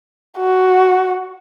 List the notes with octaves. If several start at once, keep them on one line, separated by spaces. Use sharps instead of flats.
F#4